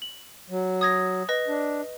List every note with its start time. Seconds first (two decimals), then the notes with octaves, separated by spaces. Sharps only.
0.02 F#7
0.50 F#3
0.81 D#6 G#6 A#6
1.29 B4 D#5 A#6
1.48 D4